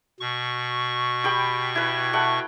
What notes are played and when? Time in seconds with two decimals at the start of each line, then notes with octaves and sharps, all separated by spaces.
0.20 B2 C#6
1.24 G4 G5 B5
1.75 E4 B4
2.13 A3 F#5 G5